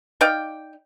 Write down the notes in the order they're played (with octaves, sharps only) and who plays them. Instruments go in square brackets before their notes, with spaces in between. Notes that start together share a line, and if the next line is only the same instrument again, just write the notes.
[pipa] D#4 D5 F5 G5